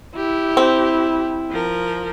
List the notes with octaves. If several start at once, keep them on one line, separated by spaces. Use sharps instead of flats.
E4 G4
C4
F3 A#4